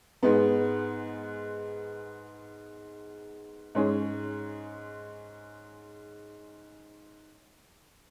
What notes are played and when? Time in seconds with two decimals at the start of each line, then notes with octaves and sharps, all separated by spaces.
0.23 G#2 G#3 B3
3.75 G#2 G#3 C#4 G#4